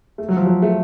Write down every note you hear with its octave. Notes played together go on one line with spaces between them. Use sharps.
A3
F#3
F3
F#3
A3